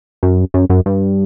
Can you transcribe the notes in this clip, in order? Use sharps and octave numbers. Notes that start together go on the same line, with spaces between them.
F#2
F#2
F#2
G2